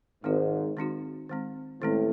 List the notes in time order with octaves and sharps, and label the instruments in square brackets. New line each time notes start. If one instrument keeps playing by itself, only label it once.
[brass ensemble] G#1 G#2 [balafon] D#3 G#3 C4 D#4 F#4
[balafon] D#3 G#3 C4 D#4 F#4
D#3 G#3 C4
[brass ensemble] A1 A2 [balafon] D#3 G#3 C4